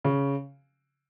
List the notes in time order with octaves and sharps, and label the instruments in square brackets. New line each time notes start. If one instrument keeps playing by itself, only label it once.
[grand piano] C#3